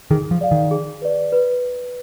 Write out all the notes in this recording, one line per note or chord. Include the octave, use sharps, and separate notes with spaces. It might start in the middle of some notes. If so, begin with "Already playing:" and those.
D#3 G#4
F3
D5 F5
D#3
G#4
B4 D5
B4